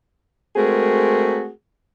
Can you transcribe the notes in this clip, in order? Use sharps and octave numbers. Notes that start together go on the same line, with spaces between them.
G#3 A3 C4 F#4 G#4 A#4